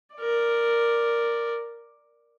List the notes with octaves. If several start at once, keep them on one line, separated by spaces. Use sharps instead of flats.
A#4 D5